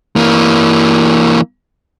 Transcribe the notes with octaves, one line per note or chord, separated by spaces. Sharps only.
E3 A#3